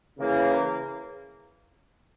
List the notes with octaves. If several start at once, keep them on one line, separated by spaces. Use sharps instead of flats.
C#3 E3 A#3